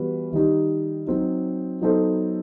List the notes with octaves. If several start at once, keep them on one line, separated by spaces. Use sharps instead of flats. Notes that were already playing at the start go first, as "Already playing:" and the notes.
Already playing: E3 G3 B3 F#4 B4
D#3 G3 D#4
F#3 C4 D#4
F#3 B3 D#4 A4 C5